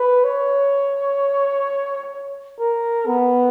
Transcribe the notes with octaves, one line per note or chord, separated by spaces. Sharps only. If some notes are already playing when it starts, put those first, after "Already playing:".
Already playing: B4
C#5
A#4
B3